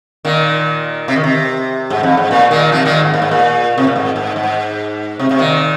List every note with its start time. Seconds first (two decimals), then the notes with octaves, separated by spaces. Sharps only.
0.25 A#2 D#3
1.08 C3
1.16 D#3
1.24 C3
1.90 G#2
2.03 F2
2.17 G#2
2.31 A#2
2.51 A#2 D#3
2.72 C3 F3
2.85 A#2 D#3
2.99 G#2
3.14 A#2
3.22 G#2
3.31 A#2
3.78 C3
3.87 A#2
3.96 G#2
4.16 G#2
4.36 G#2
5.19 C3
5.31 C3
5.39 A#2 D#3